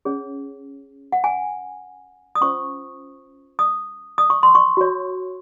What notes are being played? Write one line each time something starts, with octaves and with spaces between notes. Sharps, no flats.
C#4 G#4 C#5
F#5
G#5
D#6
C#4 F4 C5 C#6
D#6
D#6
C#6
C6
C#6
F#4 C#5